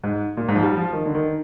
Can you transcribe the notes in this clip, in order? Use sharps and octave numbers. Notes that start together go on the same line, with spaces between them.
G#2
A#2
G#2
F3
G3
F3
D#3
D3
D#3